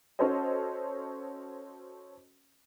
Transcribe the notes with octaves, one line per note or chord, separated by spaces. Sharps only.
C#4 F#4 A4 C5 C#5 D#5